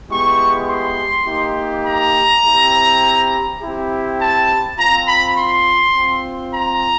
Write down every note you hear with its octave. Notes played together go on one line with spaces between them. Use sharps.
G#3 B3 E4 G4 C#6
C6
A#3 D#4 G4
A#5
C4 E4 G4
C4 E4 G4
A5
C4 F4 A#5
B5
C6
C4 F4
A#5